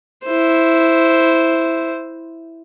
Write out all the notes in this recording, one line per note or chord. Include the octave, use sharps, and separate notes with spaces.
E4 C5